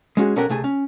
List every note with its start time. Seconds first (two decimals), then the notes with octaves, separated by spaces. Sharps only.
0.17 G#3 C#4 F4 F#4 G#4
0.36 B1 C#4 G4 A4 A#4 F#5
0.49 C#2 C3 A3 G#4 G#5 A5
0.64 C#4